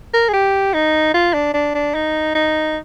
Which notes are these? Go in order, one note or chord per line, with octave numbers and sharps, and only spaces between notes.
A#4
G#4
G4
D#4
F4
D4
D4
D4
D#4
D#4